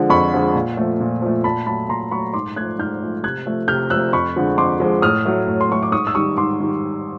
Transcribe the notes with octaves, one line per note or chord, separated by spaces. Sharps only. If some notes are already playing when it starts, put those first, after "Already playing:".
Already playing: D3 F3 G#3
F2 B5 C#6
D3 F3 G#3
A#2
F3 A3
A#2
F3 A3
A#2 A5 B5
F#3 A3 A5 B5
A#2 A#5 C6
F#3 A3 B5 C#6
G#2 C6 D6
F3 A3 F#6 G#6
G#2 F6 G6
F3 A3
C3 F#6 G#6
F3 A3
C3 F6 G6
F3 A3 E6 F#6
F2 B5 C#6
D3 F3 G#3
F2 C6 D6
D3 F3 G#3
A2 D#6 F6
F#3 A3
A2
C6
F#3 A3 C#6
D6
G#2 C#6 D#6
E6
D#3 G3 C#6 D#6
G#2 C6 D6
D#3 G3